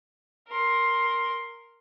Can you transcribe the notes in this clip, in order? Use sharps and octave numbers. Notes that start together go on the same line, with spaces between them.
A#4 C6